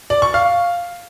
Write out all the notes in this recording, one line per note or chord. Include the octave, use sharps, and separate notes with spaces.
D5
C#6
F5